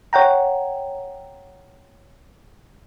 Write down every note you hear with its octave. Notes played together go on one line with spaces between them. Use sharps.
C#5 F#5 G5 A#5